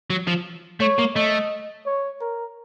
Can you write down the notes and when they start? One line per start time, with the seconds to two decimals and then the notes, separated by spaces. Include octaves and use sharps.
0.10 F#3
0.27 F3
0.80 A3 C#5
0.98 A#3
1.16 A3 D#5
1.86 C#5
2.21 A#4